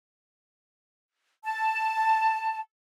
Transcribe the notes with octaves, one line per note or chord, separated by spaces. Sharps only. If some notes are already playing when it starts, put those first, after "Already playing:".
A5